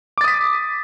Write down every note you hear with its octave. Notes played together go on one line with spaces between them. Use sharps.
D6 D#6 A6 B6